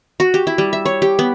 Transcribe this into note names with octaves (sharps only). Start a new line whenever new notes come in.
F#4
G4
E4
G3
E5
C#5
G4
B3